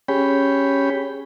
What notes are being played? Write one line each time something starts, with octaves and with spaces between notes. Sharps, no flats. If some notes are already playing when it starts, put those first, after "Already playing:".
C#4 G4 G#4 C#5 G5 B5